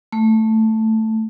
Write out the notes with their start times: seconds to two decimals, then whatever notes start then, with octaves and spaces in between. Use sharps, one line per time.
0.12 A3